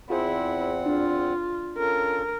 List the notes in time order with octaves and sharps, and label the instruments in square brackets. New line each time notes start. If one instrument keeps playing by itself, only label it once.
[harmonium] E2 C4 F#5 [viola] E4 [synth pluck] F4 G#4 C5
[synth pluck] D4 [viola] F4
[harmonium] C#4 F4 A4 [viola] A#4